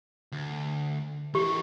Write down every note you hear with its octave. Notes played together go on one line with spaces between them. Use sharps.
D2
E3 G4 A#4